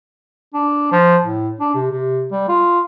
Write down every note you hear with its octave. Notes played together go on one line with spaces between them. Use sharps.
D4
F3
A2
D4
C3
C3
G3
F4